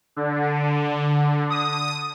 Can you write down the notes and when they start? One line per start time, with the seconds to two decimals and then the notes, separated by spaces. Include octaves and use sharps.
0.16 D3
1.50 D#6